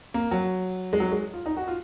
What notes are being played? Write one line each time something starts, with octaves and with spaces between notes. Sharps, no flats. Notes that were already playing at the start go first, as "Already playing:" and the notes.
A#3
F#3
G#3
F#3
G#3
F4
D#4
F#4
F4